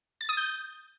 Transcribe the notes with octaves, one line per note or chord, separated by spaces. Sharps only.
A6
D#6
G6